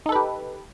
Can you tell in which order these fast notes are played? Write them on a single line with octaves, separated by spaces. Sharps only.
D#4 A4 B4 G4